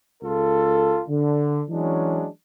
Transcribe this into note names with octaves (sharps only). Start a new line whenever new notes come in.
C#2 F4 A4
D3
E3 F#3 G#3 C#4 D4